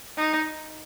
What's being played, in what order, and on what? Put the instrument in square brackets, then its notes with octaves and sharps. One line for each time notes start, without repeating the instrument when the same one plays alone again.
[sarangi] D#4